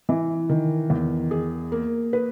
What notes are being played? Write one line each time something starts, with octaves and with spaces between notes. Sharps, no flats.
E3
D#3
E2
G#4
A#3
B4